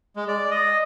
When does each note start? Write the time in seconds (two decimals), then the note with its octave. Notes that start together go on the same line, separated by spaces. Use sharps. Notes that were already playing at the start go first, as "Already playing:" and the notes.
0.16 G#3
0.28 D5
0.51 D#5